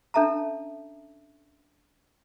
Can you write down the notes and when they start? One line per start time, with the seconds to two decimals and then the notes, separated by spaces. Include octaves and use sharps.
0.14 C#4 D4 A4 E5 A5 A#5